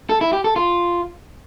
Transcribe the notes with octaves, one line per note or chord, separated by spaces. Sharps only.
A4
E4
G4
A4
F4